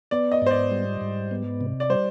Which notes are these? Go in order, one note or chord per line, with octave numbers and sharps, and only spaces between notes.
B3 D5
D#5
G#2 C5
D5
G3
G#2
B3
C3
D5
G3 C5